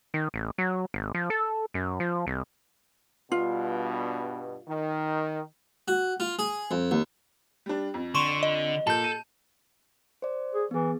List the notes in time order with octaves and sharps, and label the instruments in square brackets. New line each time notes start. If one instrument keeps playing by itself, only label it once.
[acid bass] D#3
A1
F#3
G#1
F3
A4
F#2
F3
C2
[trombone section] G2 B2 [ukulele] F4
[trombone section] D#3
[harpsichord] F#4
F4
G#4
F2
D#2
[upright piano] G3 D4
F2
[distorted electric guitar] D3 [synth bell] C6 C#6 E7
[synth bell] D#5
[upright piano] A#2 [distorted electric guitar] A4 [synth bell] A5 G6
[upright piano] D#7
[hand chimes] C5 D5
[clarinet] G#4
[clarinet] E3 [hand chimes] B3 G#4